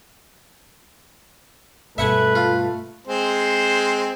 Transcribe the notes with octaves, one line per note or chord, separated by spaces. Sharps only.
G2 B2 A3 B4 E5 F#5 G#5
F4
G#3 C4 C5